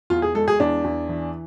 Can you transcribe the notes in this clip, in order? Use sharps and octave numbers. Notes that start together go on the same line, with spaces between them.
E2 F4
G#4
G#3 A4
G#4
E2 D4
E2
E3